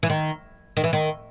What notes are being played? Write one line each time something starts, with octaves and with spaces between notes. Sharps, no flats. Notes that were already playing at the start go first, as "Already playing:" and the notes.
E3
D#3
D#3
E3
D#3